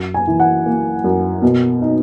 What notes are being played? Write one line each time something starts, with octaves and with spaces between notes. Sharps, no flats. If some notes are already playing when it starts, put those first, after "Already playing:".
Already playing: F#2
G#5
E3
F#5
A#3
F#2
B2
D#4